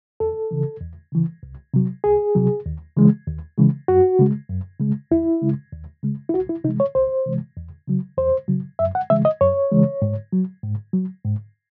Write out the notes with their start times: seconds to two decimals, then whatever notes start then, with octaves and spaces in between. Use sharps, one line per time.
0.20 E2 A4
0.51 C#3 E3
0.81 E2
1.12 C#3 E3
1.43 C2
1.74 C3 F#3
2.04 C2 G#4
2.35 C3 F#3
2.66 D#2
2.96 C#3 E3 G#3
3.27 D#2
3.58 C#3 E3 G#3
3.88 F#2 F#4
4.19 C#3 G#3
4.49 F#2
4.80 C#3 G#3
5.11 D#2 E4
5.42 C#3 G#3
5.72 D#2
6.03 C#3 G#3
6.29 E4
6.34 C2 F#4
6.49 E4
6.64 C3 E3 G#3 D#4
6.80 C#5
6.95 C2 C5
7.26 C3 E3 G#3
7.57 E2
7.87 C#3 F#3
8.18 E2 C5
8.48 C#3 F#3
8.79 F#2 E5
8.95 F#5
9.10 C#3 E3 G#3 E5
9.25 D#5
9.41 F#2 C#5
9.71 C#3 E3 G#3
10.02 G#2
10.33 F#3
10.63 G#2
10.94 F#3
11.24 G#2